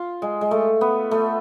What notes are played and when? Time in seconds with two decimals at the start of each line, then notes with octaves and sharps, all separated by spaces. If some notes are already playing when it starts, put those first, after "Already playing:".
Already playing: F4
0.22 G#3
0.41 G#3
0.51 A3
0.81 B3
1.11 A3